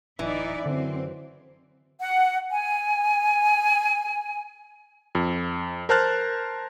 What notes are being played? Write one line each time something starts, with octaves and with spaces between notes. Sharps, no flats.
D1 E3 D#4 E4 D5
F#2 D3 C4
F#5
G#5
F2
A#4 C5 A5 F6 F#6 A6